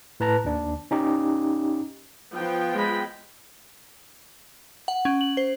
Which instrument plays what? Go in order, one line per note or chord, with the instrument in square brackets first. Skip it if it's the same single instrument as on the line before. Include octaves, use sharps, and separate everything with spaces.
[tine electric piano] A2 B4 A5 A#5
D#2 D4
C#4 D#4 G4
[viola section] F3 B3 G5
[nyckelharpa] G#3 B5
[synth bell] F#5
C#4
F#7
C5